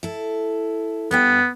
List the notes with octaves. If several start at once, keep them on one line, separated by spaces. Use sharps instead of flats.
E4 A4
G2 G3 B3 G5